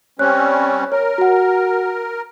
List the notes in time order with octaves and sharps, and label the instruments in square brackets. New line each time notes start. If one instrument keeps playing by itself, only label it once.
[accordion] G3 C4 C#4 [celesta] C#5 F#6
[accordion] A#4 [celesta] C#5
[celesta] F#4 F#5